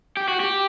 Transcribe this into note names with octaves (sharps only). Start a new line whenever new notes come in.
G4
F#4
G4